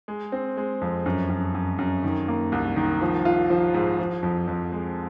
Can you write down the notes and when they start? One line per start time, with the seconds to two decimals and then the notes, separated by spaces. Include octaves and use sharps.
0.08 G#3
0.32 C4
0.57 G#3
0.81 F2
1.06 F#2
1.30 F#2
1.54 F#2
1.79 F#2
2.04 D#3
2.28 A#3
2.52 C2
2.76 D#3
3.01 F3
3.25 F4
3.50 F3
3.74 G#2
3.99 F3
4.23 F2
4.47 F2
4.72 G#3